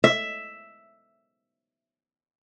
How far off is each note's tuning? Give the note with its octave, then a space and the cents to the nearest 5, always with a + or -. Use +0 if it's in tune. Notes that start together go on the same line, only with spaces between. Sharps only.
E5 +5